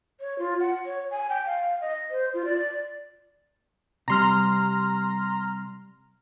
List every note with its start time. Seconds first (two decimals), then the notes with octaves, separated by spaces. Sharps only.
0.21 C#5
0.39 F4
0.60 F#5
0.85 C#5
1.11 G#5
1.29 G5
1.46 F5
1.81 D#5
2.10 C5
2.34 F4
2.45 D5
4.08 C3 G3 A#5 C6 F6